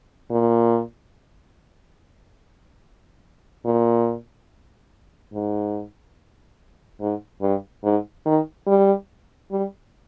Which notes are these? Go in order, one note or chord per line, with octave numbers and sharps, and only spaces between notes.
A#2
A#2
G#2
G#2
G2
G#2
D#3
G3
G3